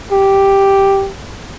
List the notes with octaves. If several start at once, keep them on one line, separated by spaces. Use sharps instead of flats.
G4